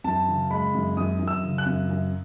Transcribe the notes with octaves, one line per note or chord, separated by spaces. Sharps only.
F#2 A5
C#3
G#3 B5
F#2
F#2 D#6
F#2
E6
C#3
F#6
F#2
F#2